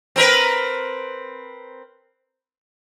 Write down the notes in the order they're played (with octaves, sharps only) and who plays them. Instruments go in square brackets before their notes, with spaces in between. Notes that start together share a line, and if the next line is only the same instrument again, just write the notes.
[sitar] C4 A#4 B4